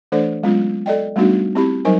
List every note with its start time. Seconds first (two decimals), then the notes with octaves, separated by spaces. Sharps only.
0.12 E3 A3 D4 A4 C5 D5
0.43 F#3 G#3 B3 C#4 F4
0.86 A4 D5 D#5 G5
1.16 G3 A3 B3 D4 D#4 F#4
1.55 C4 E4 G4 B5
1.85 F#3 G3 D#4 A#4 C5 G#5